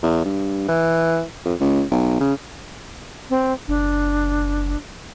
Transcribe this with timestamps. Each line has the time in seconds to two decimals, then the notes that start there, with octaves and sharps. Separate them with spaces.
0.02 E2
0.25 G2
0.68 E3
1.45 F2
1.60 C#2
1.91 B1
2.20 C#3
3.30 C4
3.68 F#1 D4